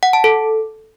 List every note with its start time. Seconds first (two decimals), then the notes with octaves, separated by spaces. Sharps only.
0.03 F#5
0.13 A5
0.24 A4